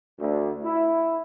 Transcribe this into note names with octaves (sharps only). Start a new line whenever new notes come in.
D2
E4